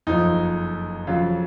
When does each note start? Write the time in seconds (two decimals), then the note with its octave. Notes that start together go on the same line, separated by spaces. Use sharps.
0.07 F#1 F2 F3 D#4
1.07 F2 C#3 F#3 F4